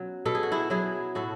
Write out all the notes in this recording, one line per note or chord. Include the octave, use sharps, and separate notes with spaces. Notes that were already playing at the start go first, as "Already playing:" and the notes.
Already playing: B2 F#3 C#4
B2 A4
G#4
F#4
E4 G#4
F#3 E4 G#4
A2 F#4 A4